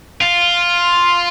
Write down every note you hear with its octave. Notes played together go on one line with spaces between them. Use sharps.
F4